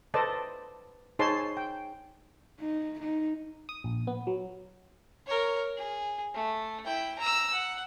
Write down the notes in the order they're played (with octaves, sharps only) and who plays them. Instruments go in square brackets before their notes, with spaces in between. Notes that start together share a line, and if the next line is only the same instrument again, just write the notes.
[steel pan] A4 B4 C5 D5 D#5 A5
D#4 G#4 C5 C#5 A5 C6
G5
[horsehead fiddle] D#4
D#4
[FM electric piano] D#6
A#1
B3
F#3
[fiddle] A#4 C#5
G#4
A3
E4 G5
A#5 E6
F#5